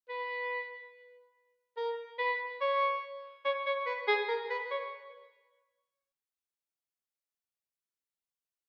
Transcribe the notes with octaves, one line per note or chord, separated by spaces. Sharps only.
B4
A#4
B4
C#5
C#5
C#5
B4
G#4
A#4
B4
C#5